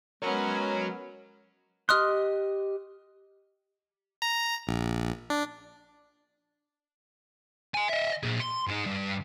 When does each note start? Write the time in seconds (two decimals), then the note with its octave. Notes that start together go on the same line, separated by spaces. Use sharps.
0.22 G#3 B3 C#4 F#4 A#4 C#5
1.89 G4 D#5 C6 D#6 F6 F#6
4.22 A#5
4.67 A#1
5.30 D4
7.74 D#5 G#5
7.89 D#5 E5
8.23 A#2 G#4
8.40 C6
8.67 G#2 D#4
8.86 G2